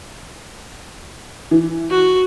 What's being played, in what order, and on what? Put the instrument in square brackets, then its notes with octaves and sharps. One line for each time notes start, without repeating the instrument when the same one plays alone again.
[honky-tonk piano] E3
[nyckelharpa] F#4